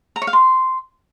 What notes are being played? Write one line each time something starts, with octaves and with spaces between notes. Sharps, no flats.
A#5
C#5
F5
C6